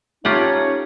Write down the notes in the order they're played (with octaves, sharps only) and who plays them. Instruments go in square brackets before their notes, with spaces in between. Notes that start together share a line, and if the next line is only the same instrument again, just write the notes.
[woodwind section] A3 C#4 D#4 [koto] F4 G4 F#5 [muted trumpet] C#5